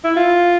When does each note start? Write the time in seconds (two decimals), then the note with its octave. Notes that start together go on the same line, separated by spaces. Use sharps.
0.04 E4
0.16 F4